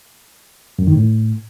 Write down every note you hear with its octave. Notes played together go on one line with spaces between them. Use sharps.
F#2
D#3
A2